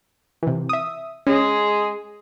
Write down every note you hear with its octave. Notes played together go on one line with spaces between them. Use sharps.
C3 E3
E5 D#6
G#3 C#4 G#4